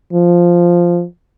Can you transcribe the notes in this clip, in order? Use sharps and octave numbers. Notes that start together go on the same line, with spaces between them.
F3